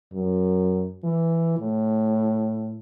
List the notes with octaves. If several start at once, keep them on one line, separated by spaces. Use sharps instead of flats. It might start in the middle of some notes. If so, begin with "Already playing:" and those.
F#2
E3
A2